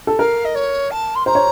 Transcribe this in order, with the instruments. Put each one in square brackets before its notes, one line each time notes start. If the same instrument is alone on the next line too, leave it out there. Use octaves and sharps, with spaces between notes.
[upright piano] A4
[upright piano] A#4 [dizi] F5
[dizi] D#5
C#5
A5
C6
[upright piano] C5 [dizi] A#5
[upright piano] C#5